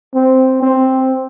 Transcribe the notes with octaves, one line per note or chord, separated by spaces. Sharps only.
C4
C4